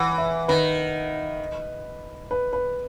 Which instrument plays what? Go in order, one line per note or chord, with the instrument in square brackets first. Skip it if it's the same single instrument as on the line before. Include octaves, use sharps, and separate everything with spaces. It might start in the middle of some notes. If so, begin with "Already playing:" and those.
Already playing: [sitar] E3 [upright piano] F#5
[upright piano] E5
[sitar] D#3 [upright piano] B4
[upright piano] B4
B4